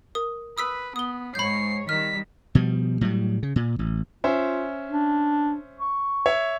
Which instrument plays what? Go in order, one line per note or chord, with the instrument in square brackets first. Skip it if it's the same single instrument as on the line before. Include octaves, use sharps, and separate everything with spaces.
[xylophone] A#4 D#6
[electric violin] B4 [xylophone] D#6 E6 B6
[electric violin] B3 [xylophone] D#6 G7
[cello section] G#2 C#5 [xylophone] B5 G6 [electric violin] C7
[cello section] D#3 G3 [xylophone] F6 [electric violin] B6
[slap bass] B2 F3 G3
A2 F#3 G3
C#3
A#2
A1
[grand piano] C#4 C5 E5 [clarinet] F4
[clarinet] D4
C#6
[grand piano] C#5 E5